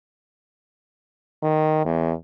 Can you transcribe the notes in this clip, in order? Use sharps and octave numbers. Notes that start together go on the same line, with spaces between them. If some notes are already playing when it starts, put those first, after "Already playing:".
D#3
E2